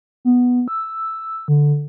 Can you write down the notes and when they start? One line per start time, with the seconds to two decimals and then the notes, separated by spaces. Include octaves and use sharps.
0.25 B3
0.68 E6
1.48 D3